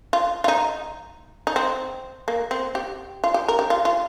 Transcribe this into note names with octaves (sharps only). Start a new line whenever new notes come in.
F4
F4
D#4
D#4
C4
A#3
C4
G4
F4
G4
A#4
G4
F4
F4